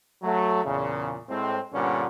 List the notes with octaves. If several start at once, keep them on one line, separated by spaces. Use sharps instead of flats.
F#3 A3
E2 A#2 C#3
A2 G#3 C4
G2 A#2 D3 G3 B3 C#4